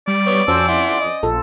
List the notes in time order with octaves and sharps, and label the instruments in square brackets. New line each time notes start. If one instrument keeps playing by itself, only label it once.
[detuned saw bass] G3 [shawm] D5
[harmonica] B3 C#5
[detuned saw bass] F2 [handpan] C#4 C5 [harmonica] F#4 A5 E6
[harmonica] E4 F#5 C6
D#5
[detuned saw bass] A#1 [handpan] F4 A4